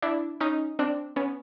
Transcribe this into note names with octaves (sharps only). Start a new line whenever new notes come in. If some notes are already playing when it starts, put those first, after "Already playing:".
D4 E4
C#4 D#4
C4 D4
B3 C#4